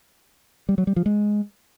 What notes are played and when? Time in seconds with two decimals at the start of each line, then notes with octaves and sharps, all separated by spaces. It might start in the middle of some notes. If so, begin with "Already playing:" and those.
0.69 G3
0.78 F#3
0.87 G3
0.96 F3
1.06 G#3